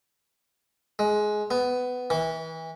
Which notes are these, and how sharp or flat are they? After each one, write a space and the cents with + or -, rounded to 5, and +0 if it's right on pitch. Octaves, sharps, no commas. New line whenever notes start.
G#3 +15
B3 +15
E3 -25